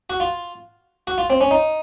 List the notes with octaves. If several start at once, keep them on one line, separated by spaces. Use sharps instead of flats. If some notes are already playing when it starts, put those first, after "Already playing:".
F#4
F4
F#4
F4
C4
C#4
D#4